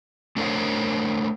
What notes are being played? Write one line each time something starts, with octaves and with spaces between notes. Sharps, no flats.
A3 D4 A#4 C5 C#5 F5